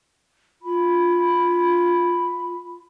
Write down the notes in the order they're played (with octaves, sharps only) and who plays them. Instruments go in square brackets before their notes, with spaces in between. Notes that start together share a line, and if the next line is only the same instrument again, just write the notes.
[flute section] F4 B5